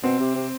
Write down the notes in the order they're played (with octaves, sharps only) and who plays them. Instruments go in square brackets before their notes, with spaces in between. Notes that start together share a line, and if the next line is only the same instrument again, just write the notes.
[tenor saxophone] B2 [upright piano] C4
[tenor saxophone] C3
C3